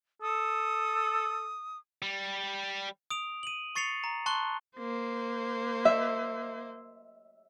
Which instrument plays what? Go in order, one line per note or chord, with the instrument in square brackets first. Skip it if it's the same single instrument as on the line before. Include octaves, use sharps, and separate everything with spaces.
[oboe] A4 [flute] D#6
[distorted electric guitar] G3
[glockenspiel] D#6 D7 F7
D#7 F#7
C#6 A6 C7 C#7 F7
A#5
A5 C6 C#6 F#6 G7
[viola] A#3 C5
[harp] E5